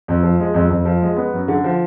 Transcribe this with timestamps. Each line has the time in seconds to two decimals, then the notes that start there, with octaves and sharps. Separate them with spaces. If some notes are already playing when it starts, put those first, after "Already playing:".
0.08 F2
0.23 F3
0.40 G#3
0.54 F2
0.70 F2
0.85 F3
1.02 G#3
1.17 B3
1.33 F#2
1.48 D3
1.64 F3